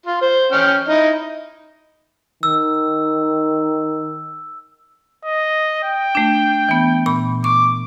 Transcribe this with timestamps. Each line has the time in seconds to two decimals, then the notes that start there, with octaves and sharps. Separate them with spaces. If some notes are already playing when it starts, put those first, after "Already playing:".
0.06 F4
0.21 C5
0.52 C#4 G5 F6
0.89 D#4 E4 D#5
2.43 D#3 E6
5.25 D#5
5.83 G5
6.15 A3 D4
6.69 E3 B3
7.06 A#2 B5
7.44 C#6 D6